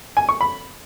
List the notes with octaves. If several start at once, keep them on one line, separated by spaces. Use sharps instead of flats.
G#5
C#6
B5